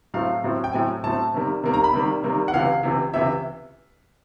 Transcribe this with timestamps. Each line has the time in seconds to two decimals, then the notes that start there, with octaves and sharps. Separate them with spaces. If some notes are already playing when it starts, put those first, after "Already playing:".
0.14 A2 F#3 A3 C4 F5
0.44 A2 F#3 A3 C4
0.64 G5
0.73 A2 F#3 A3 C4 G#5
1.04 A2 F#3 A3 C4 A5
1.34 C3 D#3 G3 A#3
1.64 C3 D#3 G3 A#3
1.74 A#5
1.84 B5
1.93 C3 D#3 G3 A#3
2.23 C3 D#3 G3 A#3
2.48 F#5
2.53 C#2 C3 E3 F5
2.83 C#2 C3 E3
3.14 C#2 C3 E3 E5